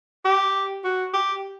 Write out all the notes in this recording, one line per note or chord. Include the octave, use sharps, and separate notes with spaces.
G4
F#4
G4